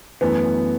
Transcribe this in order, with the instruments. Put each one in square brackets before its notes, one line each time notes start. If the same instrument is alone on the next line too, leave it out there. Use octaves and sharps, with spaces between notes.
[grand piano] F#2 E3 A3 [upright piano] B3